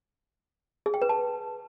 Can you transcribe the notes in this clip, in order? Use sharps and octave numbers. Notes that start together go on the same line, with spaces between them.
G#4
G5
B4
A5